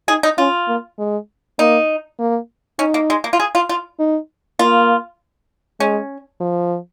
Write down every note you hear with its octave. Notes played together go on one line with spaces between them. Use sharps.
D#4 G#4
D#4
C#4 F4
A#3
G#3
A#3 D#4
A#3
C#4 D#4
A#3
G#3
A#3
F4
G#4
F4
F4
D#4
A#3 F4
G#3 C#4
F3